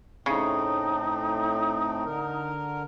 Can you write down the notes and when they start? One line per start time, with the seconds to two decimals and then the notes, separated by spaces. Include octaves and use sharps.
0.26 A2 C#3 A3 C4 D#4
2.06 D3 A#4